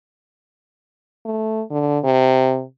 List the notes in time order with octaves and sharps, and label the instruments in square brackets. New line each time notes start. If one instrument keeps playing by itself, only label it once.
[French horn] A3
D3
C3